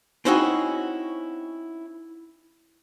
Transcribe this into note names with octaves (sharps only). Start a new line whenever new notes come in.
C4 C#4 D#4 E4 F#4 G#4